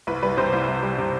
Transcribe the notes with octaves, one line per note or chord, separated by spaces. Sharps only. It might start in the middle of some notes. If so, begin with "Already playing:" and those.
C2 B4
G3 B4
C3 C5
C2
C2
G3
C3